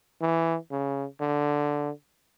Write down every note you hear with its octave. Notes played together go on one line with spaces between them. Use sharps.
E3
C#3
D3